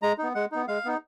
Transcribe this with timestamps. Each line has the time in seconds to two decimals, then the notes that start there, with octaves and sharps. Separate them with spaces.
0.02 G#3 A#5
0.18 B3 D#4
0.35 G#3 F#5
0.52 B3 D#4
0.68 G#3 F5
0.85 B3 D#4